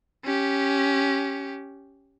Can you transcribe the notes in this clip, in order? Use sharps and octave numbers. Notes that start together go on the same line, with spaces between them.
C#4 G4